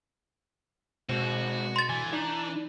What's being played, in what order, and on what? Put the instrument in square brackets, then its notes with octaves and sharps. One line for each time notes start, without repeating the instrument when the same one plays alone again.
[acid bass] B2 [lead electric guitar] G#3 C4 [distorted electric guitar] F#4
[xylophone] C6 A6
[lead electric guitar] D3 G#5 [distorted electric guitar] E3
[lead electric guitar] D4 [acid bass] D#4